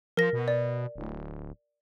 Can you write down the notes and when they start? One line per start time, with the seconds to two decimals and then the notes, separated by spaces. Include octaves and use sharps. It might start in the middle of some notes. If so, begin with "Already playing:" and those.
0.17 F3 A#4 A#6
0.33 B2
0.48 D5
0.96 D1